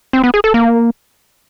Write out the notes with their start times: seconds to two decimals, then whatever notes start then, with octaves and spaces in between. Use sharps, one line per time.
0.13 C4
0.24 B3
0.34 G#4
0.44 A4
0.54 A#3